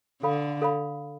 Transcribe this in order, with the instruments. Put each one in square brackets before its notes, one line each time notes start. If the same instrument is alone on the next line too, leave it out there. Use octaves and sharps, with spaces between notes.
[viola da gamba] D3 [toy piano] A4 F5 B5
[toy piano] A4 F5 B5